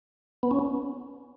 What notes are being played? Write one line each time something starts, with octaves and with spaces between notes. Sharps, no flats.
B3
C#4